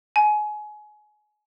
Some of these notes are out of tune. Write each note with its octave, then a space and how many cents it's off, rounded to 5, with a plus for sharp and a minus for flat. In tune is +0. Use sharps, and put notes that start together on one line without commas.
G#5 +25